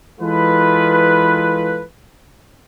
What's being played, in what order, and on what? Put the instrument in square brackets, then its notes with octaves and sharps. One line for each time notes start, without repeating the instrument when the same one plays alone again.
[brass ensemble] E3 G#3 F4 A4 B4